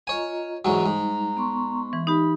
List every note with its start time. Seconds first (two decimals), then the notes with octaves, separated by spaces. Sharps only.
0.07 F4 C#5 D#5 G#5 A#5
0.65 E2 G#2 F#3 G#5 A#5 C#6
0.86 G#2 G3 D#4
1.37 B3 C6 C#6
1.93 E3
2.07 D#4 G4 B5